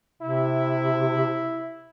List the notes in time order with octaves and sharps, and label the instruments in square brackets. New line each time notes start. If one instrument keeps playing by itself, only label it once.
[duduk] C3 [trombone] E4